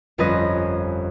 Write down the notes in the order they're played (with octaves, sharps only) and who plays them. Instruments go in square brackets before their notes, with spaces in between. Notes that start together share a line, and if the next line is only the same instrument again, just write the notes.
[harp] G1 F2 C#4 B4 D#5 A#6